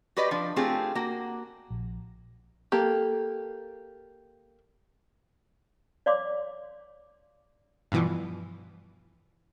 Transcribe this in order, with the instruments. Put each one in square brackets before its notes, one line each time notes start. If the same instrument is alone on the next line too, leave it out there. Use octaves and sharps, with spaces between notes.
[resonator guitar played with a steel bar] F#4 G4 B4 D5 D#5
F3 D4
A3 C4 F4 G4 G#4
A#3 F#4
[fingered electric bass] A#1
[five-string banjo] A#3 G4 A4
[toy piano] C#5 D5 F5 C6 D6
[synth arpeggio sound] G2 B2 E3 F3